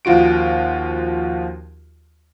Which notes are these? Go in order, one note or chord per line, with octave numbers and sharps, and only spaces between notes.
D#2 F3 F4 F#4 D7